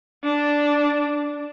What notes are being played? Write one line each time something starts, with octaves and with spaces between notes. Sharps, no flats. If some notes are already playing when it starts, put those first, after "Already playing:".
D4